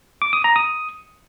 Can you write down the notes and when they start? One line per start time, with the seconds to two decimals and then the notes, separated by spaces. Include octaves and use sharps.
0.22 D6
0.33 D#6
0.44 A#5
0.56 D#6